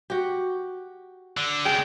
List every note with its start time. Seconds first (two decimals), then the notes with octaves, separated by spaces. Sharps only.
0.10 F#4 G4
1.37 D3
1.66 C#2 G3 G#4 G5